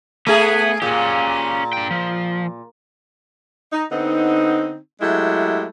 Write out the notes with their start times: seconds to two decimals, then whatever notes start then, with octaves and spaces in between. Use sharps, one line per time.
0.27 A3 B3 G#4
0.82 A#2 C#4 G4
1.73 D4 G5
1.91 F3
3.73 D#4
3.91 D3 B3 C4 D#4
5.01 F#3 G#3 A3 E4 G4